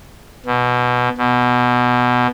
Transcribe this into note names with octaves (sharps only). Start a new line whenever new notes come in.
B2
B2